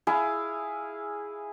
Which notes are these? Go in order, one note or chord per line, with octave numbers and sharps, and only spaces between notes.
E4 G#4 F5